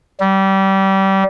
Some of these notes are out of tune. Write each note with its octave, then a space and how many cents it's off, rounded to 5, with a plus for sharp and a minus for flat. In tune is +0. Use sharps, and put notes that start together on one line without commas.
G3 -25